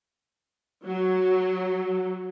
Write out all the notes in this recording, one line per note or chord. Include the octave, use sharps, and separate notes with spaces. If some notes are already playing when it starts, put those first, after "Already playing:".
F#3